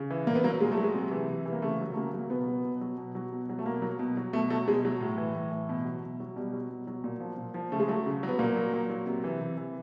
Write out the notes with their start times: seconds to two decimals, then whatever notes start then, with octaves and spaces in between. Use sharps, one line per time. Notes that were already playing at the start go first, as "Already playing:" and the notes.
Already playing: C#3
0.10 E3
0.27 A#2 A#3
0.35 B3
0.44 F#3 A#3
0.61 A#2 G#3
0.72 A3
0.77 F#3
0.83 G#3
0.94 C3
1.11 E3
1.29 C3
1.46 E3
1.53 A#3
1.62 C#3 A3
1.80 F#3
1.92 A3
1.96 C#3 A#3
2.13 F#3
2.19 A#3
2.30 B2 B3
2.47 F#3
2.65 B2
2.81 F#3
2.98 B2
3.15 F#3
3.32 B2
3.49 F#3
3.59 A3
3.66 B2 A#3
3.82 F#3
3.99 B2
4.17 F#3
4.33 B2 A3
4.50 F#3 A3
4.68 B2 G#3
4.85 F#3
5.01 A2
5.18 E3
5.35 A2
5.52 E3
5.69 B2
5.85 F#3
6.03 B2
6.20 F#3
6.36 B2 G3
6.53 F#3
6.70 B2
6.87 F#3
7.04 A#2
7.20 F3
7.38 A#2
7.54 F3
7.72 C#3 A3
7.80 G#3
7.88 F#3 A3
8.06 C#3
8.23 F#3 B3
8.39 A#2 A#3
8.56 F#3
8.73 A#2
8.90 F#3
9.07 C3
9.24 E3
9.41 C3
9.58 E3